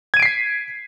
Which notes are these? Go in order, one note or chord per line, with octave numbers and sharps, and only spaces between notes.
G#6 B6 C7 D7 D#7